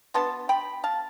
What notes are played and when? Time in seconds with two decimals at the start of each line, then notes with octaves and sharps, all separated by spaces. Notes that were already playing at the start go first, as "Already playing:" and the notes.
0.14 B2 B3 D4 A5 C6
0.49 G5 B5
0.84 F5 A5